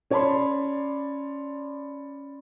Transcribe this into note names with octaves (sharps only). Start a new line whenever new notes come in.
C#4 C#5 D5 A5 B5 C6